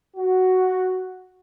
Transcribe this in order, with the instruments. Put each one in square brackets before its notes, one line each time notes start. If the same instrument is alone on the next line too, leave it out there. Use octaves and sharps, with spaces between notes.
[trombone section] F#4